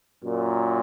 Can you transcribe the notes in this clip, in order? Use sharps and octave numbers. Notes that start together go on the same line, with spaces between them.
F#2 A#2